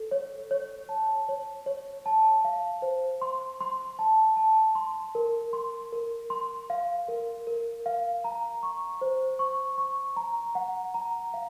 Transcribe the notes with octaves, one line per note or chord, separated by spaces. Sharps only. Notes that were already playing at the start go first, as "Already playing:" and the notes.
Already playing: A4
C#5
C#5
A5
C#5
C#5
A5
F5
C5
C6
C6
A5
A5
C6
A#4
C6
A#4
C6
F5
A#4
A#4
F5
A#5
C#6
C5
C#6
C#6
A#5
F#5
A#5
F5